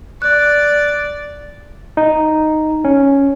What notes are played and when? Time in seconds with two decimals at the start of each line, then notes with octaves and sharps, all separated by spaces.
0.22 D5 F#6
1.97 D#4
2.84 C#4